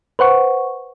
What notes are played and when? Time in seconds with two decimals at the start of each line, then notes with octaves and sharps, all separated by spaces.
0.19 B4 C5 F#5 C#6